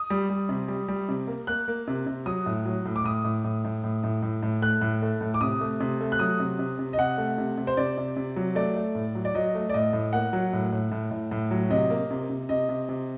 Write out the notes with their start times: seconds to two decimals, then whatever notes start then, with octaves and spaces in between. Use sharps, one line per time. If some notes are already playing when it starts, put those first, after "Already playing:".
Already playing: D#6
0.10 G3
0.30 G3
0.49 C3
0.68 G3
0.88 G3
1.09 C3
1.27 A#3
1.47 A#3 F#6
1.68 A#3
1.87 C3
2.06 C3
2.26 F#3 D#6
2.46 A2
2.66 F#3
2.86 A2
2.96 D6
3.04 A2 D#6
3.24 A2
3.44 A2
3.65 A2
3.84 A2
4.04 A2
4.22 A2
4.43 A2
4.62 A3 F#6
4.81 A2
5.02 A3
5.21 A2
5.34 D6
5.41 C3 D#6
5.61 A3
5.80 C3
6.01 A3
6.12 F#6
6.19 F#3 D#6
6.40 C3
6.59 C3
6.79 C3
6.93 D#5
6.98 C3 F#5
7.18 A3
7.38 C3
7.57 C3
7.67 C5
7.77 C3 D5
7.97 C3
8.16 C3
8.36 F#3
8.55 A3 D5
8.76 A3
8.95 A2
9.15 F#3
9.25 D5
9.35 F#3 D#5
9.55 A3
9.70 D5
9.74 A2 D#5
9.93 A2
10.13 A#3 F#5
10.33 F#3
10.53 A2
10.72 A2
10.92 A2
11.11 A2
11.31 A2
11.51 F#3
11.70 C3 D#5
11.90 A#3
12.11 C3
12.30 C3
12.49 C3 D#5
12.69 C3
12.89 C3